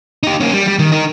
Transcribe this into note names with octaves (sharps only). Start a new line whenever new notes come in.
D#4 G4
A#3 C#4
G3
G3
D#3
D#4 A#4